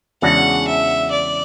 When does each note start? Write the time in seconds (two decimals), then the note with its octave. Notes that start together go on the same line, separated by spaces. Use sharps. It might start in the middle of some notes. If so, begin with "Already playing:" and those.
0.22 E2 C#3 G#3 D4 F#4 F#5
0.67 E5
1.12 D5